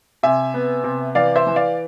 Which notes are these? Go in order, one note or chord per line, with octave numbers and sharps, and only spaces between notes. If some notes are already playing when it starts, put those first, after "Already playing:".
C3 E5 G#5
B3
C3
E3 D5 F5
C5 E5
E3
D5 F5